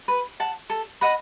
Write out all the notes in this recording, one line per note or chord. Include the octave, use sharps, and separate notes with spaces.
B4
F#5 A5
A4
D#5 F#5 B5